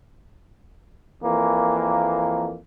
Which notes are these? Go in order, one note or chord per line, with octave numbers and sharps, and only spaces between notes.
F2 E3 A#3